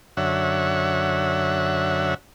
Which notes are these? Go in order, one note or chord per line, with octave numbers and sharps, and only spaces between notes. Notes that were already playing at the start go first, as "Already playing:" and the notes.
F#2 D3 C#5 E5 F#5